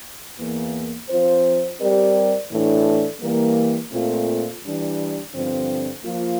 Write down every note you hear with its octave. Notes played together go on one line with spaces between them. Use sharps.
E2 E3 A#3
F3 C4 F4 C5
G3 C4 G4 A#4 D5
A2 E3 A3 D4
E3 G3 A#3
A#2 A3 C4 F4
E3 G3 D4
G2 D3 F3 C4
F3 A#3 F4